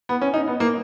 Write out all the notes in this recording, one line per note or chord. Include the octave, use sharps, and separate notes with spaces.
B3
C#4
D#4
B3
A#3